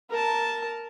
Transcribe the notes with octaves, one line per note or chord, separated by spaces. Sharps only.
A#4 A5